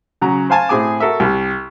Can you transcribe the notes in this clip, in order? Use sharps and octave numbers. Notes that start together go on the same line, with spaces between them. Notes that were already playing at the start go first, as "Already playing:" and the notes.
C#3 F#3 A#5
C5 F5 G#5 A5
A2 C4 G#4 G#5 D6
F#4 A4 A#4 E5
C2 G3